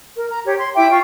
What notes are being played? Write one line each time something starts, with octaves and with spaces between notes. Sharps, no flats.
A#4
A#5
G4 C#5
C6
E4 E5 G5 D6
F4 C#6